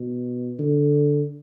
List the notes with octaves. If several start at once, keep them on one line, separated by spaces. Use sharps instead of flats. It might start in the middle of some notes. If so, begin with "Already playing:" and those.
Already playing: B2
D3